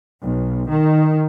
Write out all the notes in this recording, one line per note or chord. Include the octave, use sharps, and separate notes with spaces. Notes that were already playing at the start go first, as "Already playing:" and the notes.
B1
D#3